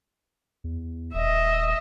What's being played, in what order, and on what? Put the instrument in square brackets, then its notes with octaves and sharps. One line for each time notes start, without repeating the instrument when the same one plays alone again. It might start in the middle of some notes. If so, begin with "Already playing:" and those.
[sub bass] E2
[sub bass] D#1 [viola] D#5 E5